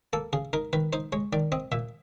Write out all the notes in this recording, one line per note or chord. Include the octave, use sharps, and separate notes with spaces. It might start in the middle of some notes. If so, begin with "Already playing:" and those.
A#3 A4
C#3 G#4
D#4 A#4
D#3 B4
D#4 C5
G#3 C#5
D#3 D5
C4 D#5
A#2 E5